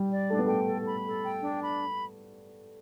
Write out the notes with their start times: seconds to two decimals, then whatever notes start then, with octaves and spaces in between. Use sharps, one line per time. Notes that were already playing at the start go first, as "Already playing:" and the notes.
Already playing: G3
0.11 D5
0.30 A3 D4
0.39 B3
0.47 A3 G5
0.67 A4
0.87 B5
1.05 A4
1.23 G5
1.42 D4
1.62 B5